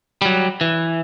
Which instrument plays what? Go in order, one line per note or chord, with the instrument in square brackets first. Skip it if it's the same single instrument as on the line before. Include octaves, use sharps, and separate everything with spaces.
[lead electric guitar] F#3 G3
E3